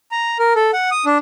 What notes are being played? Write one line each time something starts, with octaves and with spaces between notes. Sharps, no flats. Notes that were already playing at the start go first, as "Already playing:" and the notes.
A#5
A#4
A4
F#5
D#6
D4